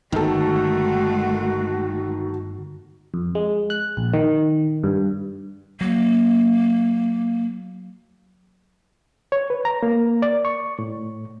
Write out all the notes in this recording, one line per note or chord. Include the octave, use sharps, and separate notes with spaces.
G1 D#3 G#3 A3 F#4 A4
F2
G#3
F#6
A#1
D#3
G2
F#3 A#3
C#5
B4
A#5
A#3
D5
C#6
A2